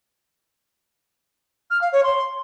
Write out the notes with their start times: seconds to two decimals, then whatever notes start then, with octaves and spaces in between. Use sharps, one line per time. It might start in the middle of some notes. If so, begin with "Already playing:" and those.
1.70 F6
1.81 F5
1.92 C#5
2.03 C6